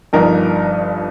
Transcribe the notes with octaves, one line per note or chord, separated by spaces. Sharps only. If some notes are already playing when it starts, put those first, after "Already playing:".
G1 G2 F3 D#4 A#4